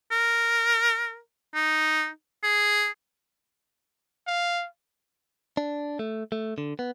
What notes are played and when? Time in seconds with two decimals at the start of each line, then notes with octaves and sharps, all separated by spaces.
0.11 A#4
1.54 D#4
2.43 G#4
4.27 F5
5.57 D4
5.99 A3
6.32 A3
6.58 D3
6.79 B3